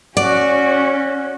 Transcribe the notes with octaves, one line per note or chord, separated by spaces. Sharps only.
C#4 F#4 D5